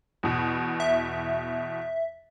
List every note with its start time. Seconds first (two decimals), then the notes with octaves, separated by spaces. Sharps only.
0.23 E2 B2
0.80 E5